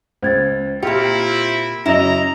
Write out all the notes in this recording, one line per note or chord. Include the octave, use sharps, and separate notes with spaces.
C#2 C5 G#6 A6
A#2 C4 E4 F4 G4 C#7
F#2 C#3 F#3 E4 D#5 A#5